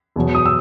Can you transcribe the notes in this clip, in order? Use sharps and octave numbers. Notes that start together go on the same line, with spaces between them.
E2 B2 F#3
D#6
E6